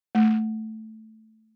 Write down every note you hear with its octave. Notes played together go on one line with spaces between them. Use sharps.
A3